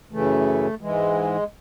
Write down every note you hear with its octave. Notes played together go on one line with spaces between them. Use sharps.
F#2 C#3 E3 A3
G#2 E3 G#3